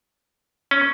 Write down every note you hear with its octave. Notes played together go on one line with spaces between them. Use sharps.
C#4